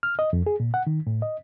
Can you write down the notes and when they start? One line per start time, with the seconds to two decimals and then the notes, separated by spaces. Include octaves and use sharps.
0.03 F6
0.19 D#5
0.33 F2
0.46 G#4
0.60 A#2
0.74 F#5
0.87 D#3
1.07 A2
1.22 D#5